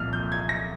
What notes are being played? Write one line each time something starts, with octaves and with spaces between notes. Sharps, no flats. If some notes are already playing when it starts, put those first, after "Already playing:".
Already playing: C2 A#2 F3 F6
G6
G#6
A#6